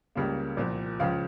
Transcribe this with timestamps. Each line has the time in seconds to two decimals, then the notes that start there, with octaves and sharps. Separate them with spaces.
0.15 C#2 C#3 G3 A#3
0.57 C2 A#2 F3
0.99 C#2 C#3 F3 F5